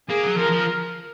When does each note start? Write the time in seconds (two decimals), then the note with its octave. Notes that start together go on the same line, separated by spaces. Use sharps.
0.09 A#3 G#4
0.24 F#3
0.38 F3 A#4
0.52 F3